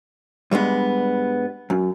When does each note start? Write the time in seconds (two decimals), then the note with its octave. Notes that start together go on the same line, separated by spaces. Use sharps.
0.51 G2 G3 G#3 B3
1.70 F#2